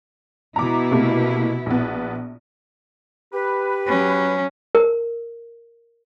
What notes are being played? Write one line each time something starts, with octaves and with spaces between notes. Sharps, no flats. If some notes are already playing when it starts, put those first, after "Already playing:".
B2 E4 A#5 D6
C3 A3 A#3
A#1 B3
G4 B4
F#3 C#4
A#4